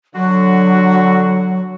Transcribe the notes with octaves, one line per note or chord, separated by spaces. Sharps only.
D3 F#3 F#4